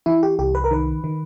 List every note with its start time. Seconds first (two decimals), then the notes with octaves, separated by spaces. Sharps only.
0.06 E3 E4
0.23 G4
0.39 C2 G4
0.55 B4
0.64 A#4
0.71 D#3 B4
1.04 D#3